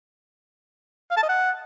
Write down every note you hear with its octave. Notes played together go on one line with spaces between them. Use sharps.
F5
A5
D#5
F#5